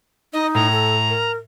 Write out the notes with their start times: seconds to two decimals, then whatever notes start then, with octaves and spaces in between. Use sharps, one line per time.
0.33 D#4 D#5
0.55 A2 A#5
0.72 A4
1.09 A#4